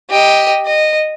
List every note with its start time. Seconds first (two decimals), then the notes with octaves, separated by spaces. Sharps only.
0.10 G4 D#5
0.67 D#5